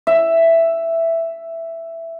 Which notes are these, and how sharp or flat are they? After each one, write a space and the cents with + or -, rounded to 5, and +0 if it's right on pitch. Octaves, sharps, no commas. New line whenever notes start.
E5 +5